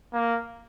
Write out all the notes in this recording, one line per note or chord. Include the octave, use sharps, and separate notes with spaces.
A#3